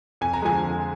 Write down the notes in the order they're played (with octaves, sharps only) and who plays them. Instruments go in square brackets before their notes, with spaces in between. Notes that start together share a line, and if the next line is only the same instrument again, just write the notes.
[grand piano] F2 G#5
A#5
D3 F3 G#3 G#5
F2